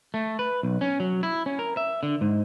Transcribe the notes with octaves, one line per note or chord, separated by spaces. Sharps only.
A3
B4
B1
C#4
F#3
E4
C#4
A#4
E5
D3
G#2